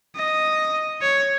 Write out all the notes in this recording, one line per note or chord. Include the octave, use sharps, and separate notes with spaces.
D#5
C#5